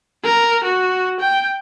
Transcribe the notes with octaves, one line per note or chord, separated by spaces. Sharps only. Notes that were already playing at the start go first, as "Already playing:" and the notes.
A#4
F#4
G5